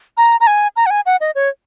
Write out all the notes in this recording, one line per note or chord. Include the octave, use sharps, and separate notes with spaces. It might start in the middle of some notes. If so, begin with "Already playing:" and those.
A#5
A#5
G#5
A#5
F#5
G#5
F#5
D#5
C#5